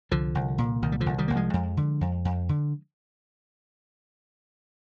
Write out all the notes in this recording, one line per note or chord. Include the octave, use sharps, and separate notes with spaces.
C2 D3 F3
C2
A#2
C2 D#3
G3
D3 F3
C2
D#3 G3
C2 A#3
F3 G#3
F2
D3
F2
F2
D3